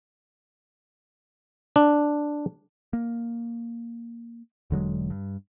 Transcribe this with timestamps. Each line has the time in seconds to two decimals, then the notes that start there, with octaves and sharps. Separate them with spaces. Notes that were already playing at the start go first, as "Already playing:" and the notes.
1.76 D4
2.93 A#3
4.70 E1 D3 F#3 G#3
5.10 G2